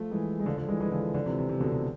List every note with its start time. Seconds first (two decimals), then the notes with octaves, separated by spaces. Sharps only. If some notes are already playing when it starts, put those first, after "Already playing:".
Already playing: F3 A3
0.11 E3 G#3
0.40 G#3
0.45 D3 F3
0.57 D3 F3
0.68 E3 G#3
0.80 E3 G#3
0.91 D3 F3
1.14 D3 F3
1.26 C3 E3
1.38 C3
1.49 C3
1.60 B2 D3
1.72 C3